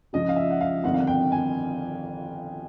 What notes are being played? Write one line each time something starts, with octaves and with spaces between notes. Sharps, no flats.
C#2 C#3 F3 D#5
F5
E5
F#5
F5
G1 F2 C3 D#3 F#5
F5
F#5
G5
G#5